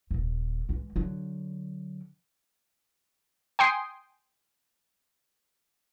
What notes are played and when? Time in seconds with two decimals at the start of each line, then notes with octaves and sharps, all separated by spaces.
0.11 D#1 A#2
0.69 E3 G#3
0.96 D3 F#3
3.59 G5 G#5 C6 D#6 C7